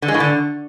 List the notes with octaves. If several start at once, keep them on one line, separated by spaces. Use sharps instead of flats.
D3
G#3
A2
D3